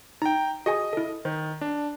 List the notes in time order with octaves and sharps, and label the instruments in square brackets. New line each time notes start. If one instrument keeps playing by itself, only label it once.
[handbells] D#4 [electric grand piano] G5 A#5
[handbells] F#4 G#4 G#5 [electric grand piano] D#5
[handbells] E4 A4
[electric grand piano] D#3 [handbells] C5
[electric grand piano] D4